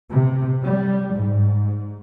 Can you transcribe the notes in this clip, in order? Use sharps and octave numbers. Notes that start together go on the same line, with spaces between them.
C3
G3
G#2